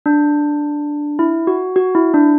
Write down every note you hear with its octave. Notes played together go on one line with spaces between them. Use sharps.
D4
E4
F#4
F#4
E4
D4